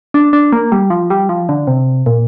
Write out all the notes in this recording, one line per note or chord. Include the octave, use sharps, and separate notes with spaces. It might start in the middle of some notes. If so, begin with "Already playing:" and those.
D4
D4
A#3
G3
F3
G3
F3
D3
C3
A#2